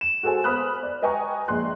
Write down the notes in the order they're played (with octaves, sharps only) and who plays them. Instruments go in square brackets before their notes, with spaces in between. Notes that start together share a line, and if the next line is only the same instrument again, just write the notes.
[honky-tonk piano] E7
F#4 G#4 A4 C5 G#5
B3 C5 B5 D#6 F6 F#6
D5
B4 D#5 G5 G#5 A#5 C#6
A#1 G#3 C6 F#6